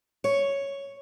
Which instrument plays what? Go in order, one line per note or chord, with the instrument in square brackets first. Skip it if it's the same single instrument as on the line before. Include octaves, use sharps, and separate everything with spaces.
[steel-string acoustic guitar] C#5